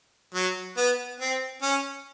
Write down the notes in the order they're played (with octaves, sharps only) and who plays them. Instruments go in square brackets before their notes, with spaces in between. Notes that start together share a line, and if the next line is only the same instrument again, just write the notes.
[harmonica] F#3
B3
C4
C#4